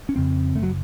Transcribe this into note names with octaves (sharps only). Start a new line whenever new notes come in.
C#4
F2 C#3 C4
F#1 A3
F#3